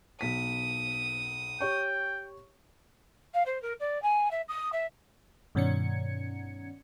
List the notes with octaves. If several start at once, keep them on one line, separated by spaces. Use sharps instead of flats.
B1 D#6 B6
G4 C#5 G5 C#6
F5
C5
A#4
D5
G#5
E5
D#6
E5
G2 B2 D#3 C#4 G#6 C#7